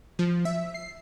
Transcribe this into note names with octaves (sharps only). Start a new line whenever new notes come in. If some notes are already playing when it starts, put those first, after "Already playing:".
F3
E5
C7